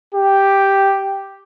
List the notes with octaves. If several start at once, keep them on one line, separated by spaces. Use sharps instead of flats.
G4